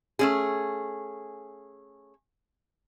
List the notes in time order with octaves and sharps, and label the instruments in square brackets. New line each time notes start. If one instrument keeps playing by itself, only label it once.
[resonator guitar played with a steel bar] A3 C#4 G#4